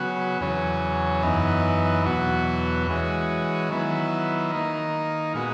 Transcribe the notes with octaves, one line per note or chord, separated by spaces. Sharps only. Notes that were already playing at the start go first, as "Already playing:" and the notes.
Already playing: C#3 F#3 B3 F#4
E2 C#3 F#3 C#4
F#2 E3 B3 D#4
E2 B2 F#3 B3 F#4
E3 G#3 C#4 F#4
D#3 F#3 B3 E4
D#3 A#3 D#4
A#2 G#3 B3 F#4